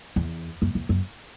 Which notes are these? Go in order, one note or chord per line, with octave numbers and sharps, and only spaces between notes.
E2
F#2
E2
F#2